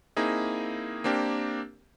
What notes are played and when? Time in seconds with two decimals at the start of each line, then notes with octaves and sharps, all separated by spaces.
0.16 A#3 C4 D#4 E4 G#4
1.04 A#3 C4 D4 G4 A#4